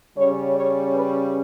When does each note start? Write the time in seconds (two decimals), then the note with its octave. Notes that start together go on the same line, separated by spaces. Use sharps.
0.17 C#3 G3 C#4 C#5
0.56 C#5
0.94 B4